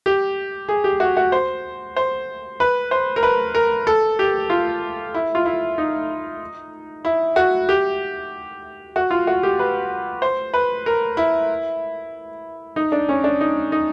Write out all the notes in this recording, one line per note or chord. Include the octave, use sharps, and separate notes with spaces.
G4
G#4
G4
F#4
F#4
C5
C5
B4
C5
A#4
B4
A#4
A4
G4
F4
E4
F4
E4
D#4
E4
F#4
G4
F#4
F4
F#4
G4
B4
C5
B4
A#4
E4
D#4
D4
C#4
D4
D#4
D#4